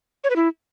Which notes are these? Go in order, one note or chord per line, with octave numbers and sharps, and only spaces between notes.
C#5
B4
E4